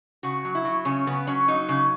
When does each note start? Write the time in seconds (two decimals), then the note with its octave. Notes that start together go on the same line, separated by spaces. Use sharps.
0.23 C#3 F#4
0.45 F#3
0.55 E4
0.65 F#3
0.85 C#3 C#4
1.07 C#3 B3
1.27 F#3 C#4
1.48 F#3 D#4
1.69 C#3